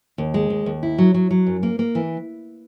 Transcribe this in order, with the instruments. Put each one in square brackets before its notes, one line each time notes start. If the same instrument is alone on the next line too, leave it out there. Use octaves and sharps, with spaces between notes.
[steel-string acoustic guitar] D#2
G#3
D#2
D#2
E4
F#3
F#3
F#3
F#2
A#3
A#3
E3